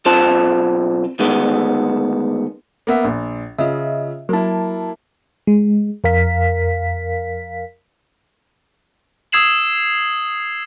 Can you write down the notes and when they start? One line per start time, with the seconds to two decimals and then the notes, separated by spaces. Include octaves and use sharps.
0.05 B1 C4 F4 C5 A5
1.19 D2 D#3 G#3 B3
2.87 A#3 B3 E5
3.04 A#1
3.58 C#3 F4 D#5 E5
4.29 F#3 A#3 E4 A5
5.47 G#3
6.04 F2 A#4 F5 B6
9.32 D#6 E6 G#6 C7 E7 F#7